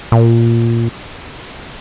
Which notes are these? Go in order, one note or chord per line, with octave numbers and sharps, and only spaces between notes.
A#2